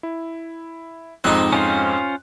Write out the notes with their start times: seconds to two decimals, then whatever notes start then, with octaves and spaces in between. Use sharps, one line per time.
0.03 E4
1.24 F2 G#2 C4 D#4 F#6
1.53 C#4 F4 C5